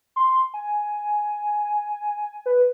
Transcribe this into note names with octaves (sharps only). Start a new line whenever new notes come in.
C6
G#5
B4